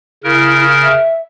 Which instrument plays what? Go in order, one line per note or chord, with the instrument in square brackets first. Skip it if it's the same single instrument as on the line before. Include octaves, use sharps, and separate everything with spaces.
[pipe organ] C#3 A#4 [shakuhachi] E4
[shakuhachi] E5